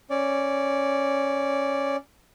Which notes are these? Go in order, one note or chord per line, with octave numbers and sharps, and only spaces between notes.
C#4 D5